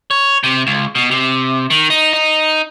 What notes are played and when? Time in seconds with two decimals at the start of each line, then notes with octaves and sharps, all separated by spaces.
0.11 C#5
0.43 C3
0.67 C#2
0.95 B2
1.11 C3
1.70 D#3
1.90 D#4
2.13 D#4